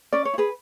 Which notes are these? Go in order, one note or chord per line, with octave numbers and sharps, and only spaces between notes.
C#4 D5
C#5
E4
G#4 B4